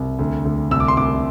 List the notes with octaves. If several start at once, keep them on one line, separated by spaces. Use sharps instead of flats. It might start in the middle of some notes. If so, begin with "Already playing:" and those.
Already playing: C2
D2
D2
C2 E6
D6
C6
C2 D6